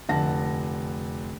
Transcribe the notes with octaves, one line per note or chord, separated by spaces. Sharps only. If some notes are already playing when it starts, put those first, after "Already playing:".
F1 D3 F#5 A5 A#6